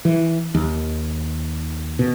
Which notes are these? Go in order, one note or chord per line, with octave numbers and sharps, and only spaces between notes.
E3
D#2
B2